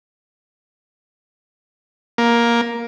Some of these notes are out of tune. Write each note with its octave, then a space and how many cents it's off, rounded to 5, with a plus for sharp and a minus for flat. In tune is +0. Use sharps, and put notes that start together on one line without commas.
A#3 +10